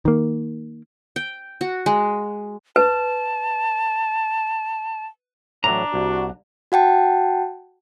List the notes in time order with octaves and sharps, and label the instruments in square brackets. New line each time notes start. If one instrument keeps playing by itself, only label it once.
[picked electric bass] D#3 A#3
[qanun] G5
F#4
G#3
[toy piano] B4 [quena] A5
[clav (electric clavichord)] A2 E3 F#3 [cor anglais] D4 [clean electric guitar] A#5
[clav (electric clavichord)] C2 [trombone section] F#4
[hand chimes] F#4 F#5 G5 A5